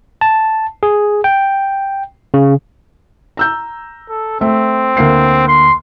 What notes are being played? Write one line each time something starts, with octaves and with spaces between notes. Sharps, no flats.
A5
G#4
G5
C#3
A#5 E6 G6
A4
A3 C4
D2 A#3 C7
C6